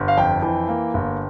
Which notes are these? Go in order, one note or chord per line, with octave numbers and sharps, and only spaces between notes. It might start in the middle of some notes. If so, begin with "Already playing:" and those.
Already playing: G1
F5
F2 G5
E3
A#3
G1